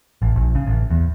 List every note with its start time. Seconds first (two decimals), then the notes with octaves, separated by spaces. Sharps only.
0.22 A1
0.35 A#1
0.55 C#3
0.66 A1
0.90 E2